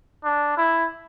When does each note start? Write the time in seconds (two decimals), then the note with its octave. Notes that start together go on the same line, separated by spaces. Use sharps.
0.24 D4
0.57 E4